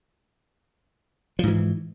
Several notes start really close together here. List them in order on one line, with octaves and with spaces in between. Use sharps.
F3 G#2 E3